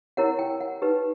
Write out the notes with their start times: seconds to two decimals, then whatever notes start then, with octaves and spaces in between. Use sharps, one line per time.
0.17 E4 G4 A#4 C#5 F#5
0.39 G5
0.60 F#5
0.82 D#4 G4 B4